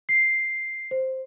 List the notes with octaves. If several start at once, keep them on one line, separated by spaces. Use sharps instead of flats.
C7
C5